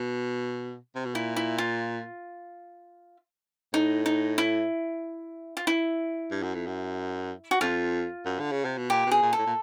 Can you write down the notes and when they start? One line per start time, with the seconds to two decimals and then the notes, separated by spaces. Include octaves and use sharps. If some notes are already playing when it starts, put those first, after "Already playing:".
Already playing: B2
0.95 C3
1.05 B2
1.15 A#2 E4
1.36 E4
1.58 F4
3.73 A2 D#4
4.06 D#4
4.38 E4
5.57 F4
5.67 E4
6.31 G2
6.43 F#2
6.55 F2
6.66 F#2
7.51 F#4
7.61 F2 F4
8.26 F#2
8.40 D3
8.52 C#3
8.65 C3
8.77 B2
8.90 A#2 G4
9.06 B2
9.11 G#4
9.22 A#2
9.33 A4
9.38 A2
9.47 A#2